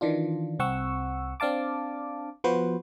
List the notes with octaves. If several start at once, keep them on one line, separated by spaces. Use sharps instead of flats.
D#3 E3 D4 F4
C2 C4 F#5 C#6 E6
C4 D4 F5 A5 D6
F3 B3 F#4 B4 C5